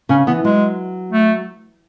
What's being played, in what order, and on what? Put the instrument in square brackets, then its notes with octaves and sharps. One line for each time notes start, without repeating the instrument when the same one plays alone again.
[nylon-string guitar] C#3 [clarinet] C#4
[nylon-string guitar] E3 [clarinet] B3
[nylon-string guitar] F#3 [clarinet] G#3
[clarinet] A3